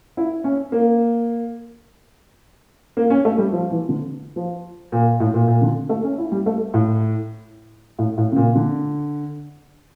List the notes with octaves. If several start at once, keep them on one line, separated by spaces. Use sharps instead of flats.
E4
C#4
A#3
A#3
C#4
A3
G3
F3
E3
D3
F3
A#2
A2
A#2
A#2
D3
A3
C#4
E4
G3
A3
A2
A2
A2
C#3
A#2
D3